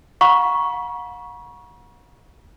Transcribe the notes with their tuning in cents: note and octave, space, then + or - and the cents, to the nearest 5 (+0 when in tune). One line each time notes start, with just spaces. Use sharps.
F#5 -40 A#5 +45 C#6 +0